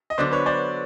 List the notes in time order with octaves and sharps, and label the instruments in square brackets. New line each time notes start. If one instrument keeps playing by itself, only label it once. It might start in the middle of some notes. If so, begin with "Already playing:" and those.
[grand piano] D#5
[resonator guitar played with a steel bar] D3 F#3 B3 [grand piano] C5 D5
[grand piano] B4 C#5
C5 D5